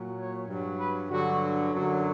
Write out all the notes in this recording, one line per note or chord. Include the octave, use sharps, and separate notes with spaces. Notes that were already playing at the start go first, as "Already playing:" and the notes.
Already playing: A#2 F#3
C#5
G2 F#3
B4
G2 D3 F#3 F#4
F#2 D3 F#3